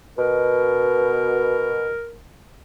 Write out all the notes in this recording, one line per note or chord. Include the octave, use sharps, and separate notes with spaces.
B2 A#4